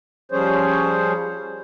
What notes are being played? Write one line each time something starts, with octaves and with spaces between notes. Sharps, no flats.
F3 G3 C#4 G#4 C5 C#5